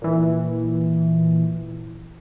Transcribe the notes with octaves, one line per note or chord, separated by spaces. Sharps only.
A#2 E3